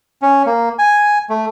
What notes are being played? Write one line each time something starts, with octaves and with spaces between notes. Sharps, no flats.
C#4
A#3
G#5
A3